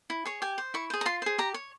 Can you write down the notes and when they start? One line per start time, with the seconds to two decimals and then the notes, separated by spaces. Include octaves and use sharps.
0.10 E4
0.25 G#4 C#5
0.42 G4 G#5
0.58 C5
0.74 E4 C#6
0.90 G#4 C5
1.01 A#5
1.06 F4 C6
1.22 G#4 C5
1.38 G4 A#5
1.54 C#5